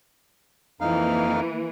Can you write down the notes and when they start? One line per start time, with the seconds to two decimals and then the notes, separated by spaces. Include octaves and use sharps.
0.81 F2 E3 A#3 D#4 F5